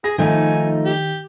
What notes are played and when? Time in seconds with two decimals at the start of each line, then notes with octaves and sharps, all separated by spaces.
0.04 G#4 A#6
0.18 D#3 F3 A3 D#4 G#5
0.85 G4